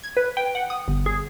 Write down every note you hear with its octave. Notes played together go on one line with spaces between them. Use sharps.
G#6
B4
G5
F#5
D#6
G1
G#4